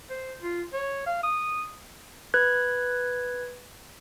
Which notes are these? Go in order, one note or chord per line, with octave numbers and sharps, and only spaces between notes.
C5
F4
C#5
F5
D#6
B4 F#6 G#6